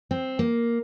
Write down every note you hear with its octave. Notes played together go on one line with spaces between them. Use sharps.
C4
A#3